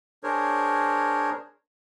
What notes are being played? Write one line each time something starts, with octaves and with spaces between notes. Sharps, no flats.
D4 G#4 A#4 C5 C#5